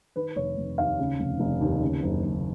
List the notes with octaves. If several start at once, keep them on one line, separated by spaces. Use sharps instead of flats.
D#3 B4
F1 C#5
F1
D#2 F5
C#3
F1
F1
D#2
C#3
F#1
F#1